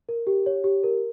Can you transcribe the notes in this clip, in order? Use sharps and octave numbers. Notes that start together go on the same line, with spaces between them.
A#4
G4
C#5
G4
A#4